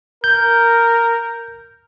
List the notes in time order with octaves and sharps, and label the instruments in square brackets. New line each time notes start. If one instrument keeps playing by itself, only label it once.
[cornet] A#4 [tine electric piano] G6